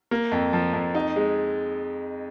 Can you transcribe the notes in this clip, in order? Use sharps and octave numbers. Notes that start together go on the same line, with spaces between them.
A#3
F2
F3
F2
D#4
G#3